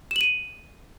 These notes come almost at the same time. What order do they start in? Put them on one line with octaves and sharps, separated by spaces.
E7 F#7 D#7